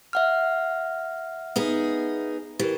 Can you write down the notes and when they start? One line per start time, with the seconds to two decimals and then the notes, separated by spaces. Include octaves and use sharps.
0.13 E5 F#5 F6
1.56 B3 D#4 G#4
2.59 E3 G4 A#4